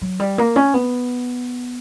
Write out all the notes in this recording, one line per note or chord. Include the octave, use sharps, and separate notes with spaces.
F#3
G3
A#3
C#4
B3